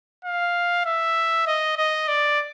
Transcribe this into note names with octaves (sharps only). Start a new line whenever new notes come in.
F5
E5
D#5
D#5
D5